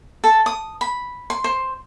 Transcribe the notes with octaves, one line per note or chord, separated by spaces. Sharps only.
A4
D#6
B5
C6
C5